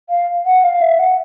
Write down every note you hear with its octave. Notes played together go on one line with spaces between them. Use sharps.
F5
F#5
F5
E5
F#5